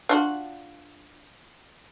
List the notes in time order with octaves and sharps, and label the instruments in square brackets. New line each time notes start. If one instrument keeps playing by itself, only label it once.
[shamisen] D4 F4 F#4